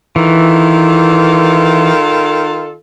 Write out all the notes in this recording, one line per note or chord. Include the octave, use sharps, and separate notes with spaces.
D#3 E3 F4 A4